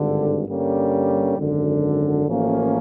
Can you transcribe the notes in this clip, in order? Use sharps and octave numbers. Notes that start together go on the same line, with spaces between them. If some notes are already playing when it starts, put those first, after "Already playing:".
Already playing: G#1 G2 D3
G2 D3 G3 A#3 C#4
G#1 F#2 D3
A1 A2 F3 A#3 C#4